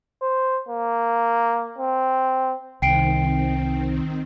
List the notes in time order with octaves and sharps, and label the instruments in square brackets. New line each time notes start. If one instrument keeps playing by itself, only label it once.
[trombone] C5
A#3
C4
[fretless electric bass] C2 [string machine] D#3 C4 [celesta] G5 C7 D7